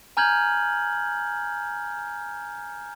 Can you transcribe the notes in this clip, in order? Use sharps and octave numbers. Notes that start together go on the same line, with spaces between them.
G#5 A#5 F6 G6 G#6 F#7